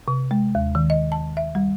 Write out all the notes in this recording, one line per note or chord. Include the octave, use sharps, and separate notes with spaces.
C3
G#3
D#2
D#3
D#5
A5
E5
G3